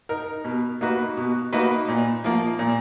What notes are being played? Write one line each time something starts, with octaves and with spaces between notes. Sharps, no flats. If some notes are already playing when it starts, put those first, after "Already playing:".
D#4 A#4
B2
A#3 D#4 F#4 B4
B2
A#3 D#4 F#4 B4
A#2
F3 A#3
A#2